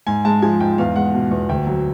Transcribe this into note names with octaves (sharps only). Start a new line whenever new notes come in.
G#2 G#5
G#3 A5
F3 G#5
G#2 G5
E2 F5
G#3 F#5
B2
E2
D2 G5
F#3